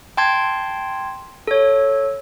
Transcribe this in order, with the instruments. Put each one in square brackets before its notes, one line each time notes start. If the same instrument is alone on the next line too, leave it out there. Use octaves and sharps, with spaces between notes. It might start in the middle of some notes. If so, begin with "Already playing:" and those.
[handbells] G5 A5 C6 G#6
A4 C#5